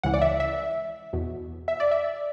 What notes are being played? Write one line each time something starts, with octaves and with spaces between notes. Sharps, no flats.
C#2 C#3 E3 F#5
D5
E5
E5
E2 B2
E5
D5
E5